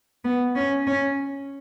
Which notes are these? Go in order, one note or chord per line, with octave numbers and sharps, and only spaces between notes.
B3
C#4
C#4